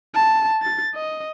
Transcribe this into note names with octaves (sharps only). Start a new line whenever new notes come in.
A5
A6
D#5